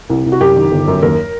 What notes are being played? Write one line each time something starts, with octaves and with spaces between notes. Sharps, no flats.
C2
C2
F#4
F#2 G4
D#3
G1
F#2
D#2 A#4